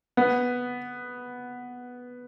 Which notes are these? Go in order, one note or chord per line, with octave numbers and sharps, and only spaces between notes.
B3